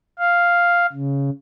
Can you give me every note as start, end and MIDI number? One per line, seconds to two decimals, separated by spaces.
0.19 0.86 77
0.93 1.30 49